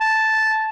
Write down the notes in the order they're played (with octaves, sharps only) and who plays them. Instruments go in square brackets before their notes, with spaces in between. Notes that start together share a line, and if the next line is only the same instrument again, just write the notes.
[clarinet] A5